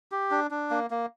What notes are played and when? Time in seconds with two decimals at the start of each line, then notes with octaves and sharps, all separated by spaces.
0.12 G4
0.31 D4
0.51 D4
0.71 A#3
0.90 A#3